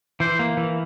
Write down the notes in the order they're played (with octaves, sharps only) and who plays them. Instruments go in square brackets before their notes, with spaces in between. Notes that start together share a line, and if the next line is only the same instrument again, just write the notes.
[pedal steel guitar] E3 [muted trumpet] C5
[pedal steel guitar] A#3
E3